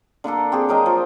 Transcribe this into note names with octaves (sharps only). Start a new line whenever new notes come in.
D3 A#3 D4 A4
C4 G4 G#4
F#3 A#4 D#5 G5
F3